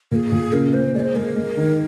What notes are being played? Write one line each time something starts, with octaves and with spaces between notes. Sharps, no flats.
A#2 G#4 A#4
A#2
C#3 A#4
A#3 C5
G#3 C5 D5
G#3 A#4
G#3
D#3